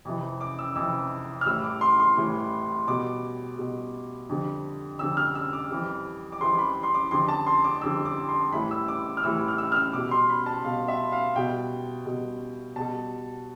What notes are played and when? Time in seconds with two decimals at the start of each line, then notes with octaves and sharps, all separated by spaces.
0.05 F2 C3 E3
0.41 D6
0.59 E6
0.76 F2 C3 E3 E6
1.41 F6
1.46 A2 E3 G3 E6
1.64 D6
1.81 C6
2.00 C6
2.17 A2 E3 G3
2.87 B2 G3 D6
3.58 B2 G3
4.29 F2 D3 G3
4.99 F2 D3 G3 E6
5.17 F6
5.35 E6
5.53 D6
5.71 F2 E3 G3
6.32 D6
6.41 F2 E3 G3 C6
6.59 B5
6.83 C6
6.94 D6
7.11 F2 D3 G3 C6
7.28 A5
7.46 C6
7.64 D6
7.81 F2 D3 G3 E6
8.05 D6
8.29 C6
8.52 A2 E3 G3 B5
8.71 E6
8.88 D6
9.17 F6
9.23 A2 E3 G3 E6
9.48 F6
9.58 E6
9.72 F6
9.76 E6
9.93 B2 G3 D6
10.11 C6
10.29 B5
10.46 A5
10.64 B2 G3 F5
10.88 E5
11.12 F5
11.36 B2 G3 G5
12.06 B2 G3
12.76 B2 G3 A5